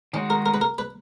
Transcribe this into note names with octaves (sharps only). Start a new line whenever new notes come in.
D#3 G#3 C#4 D#4 F#4
A#4
A#4
B4
A#4
B4